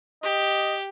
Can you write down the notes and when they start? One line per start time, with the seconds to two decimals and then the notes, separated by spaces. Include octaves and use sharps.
0.23 G4 D#5